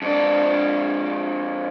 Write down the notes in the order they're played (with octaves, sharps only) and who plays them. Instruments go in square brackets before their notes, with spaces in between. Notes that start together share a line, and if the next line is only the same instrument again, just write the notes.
[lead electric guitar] F2 D4